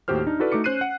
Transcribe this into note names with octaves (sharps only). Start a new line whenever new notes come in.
D#2 A2 F#4 G4 C5 F6
D4 D#4
E4 F#4 A4 B4 D5
A3 D#4 F#4 D6 C#7
C#4 C5 F#6 C7 D#7
F#5